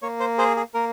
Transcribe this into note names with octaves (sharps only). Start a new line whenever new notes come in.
A#3 C#5
C5
G#4 C5
G#4
A#3 A#4